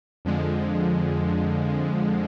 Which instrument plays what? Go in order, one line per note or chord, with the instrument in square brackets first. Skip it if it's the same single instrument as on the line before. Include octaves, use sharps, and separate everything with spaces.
[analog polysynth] F2 D3 F3 G#3